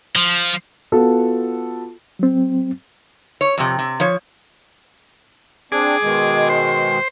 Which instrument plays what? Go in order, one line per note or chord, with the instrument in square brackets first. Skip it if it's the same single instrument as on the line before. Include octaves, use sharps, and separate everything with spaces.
[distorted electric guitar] F3
[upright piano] B3 F4 F#4 A4
[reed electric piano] F#3 C4
[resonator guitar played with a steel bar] C#5
F2 C3
C3
F3 C#5
[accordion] C4 D4 [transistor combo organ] G#4 D6
[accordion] B2 D#3 G#3
[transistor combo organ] C5